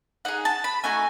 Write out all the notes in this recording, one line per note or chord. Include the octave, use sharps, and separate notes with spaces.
D#4 G#4 F#5
A5
B5
A3 D#4 F#4 G#5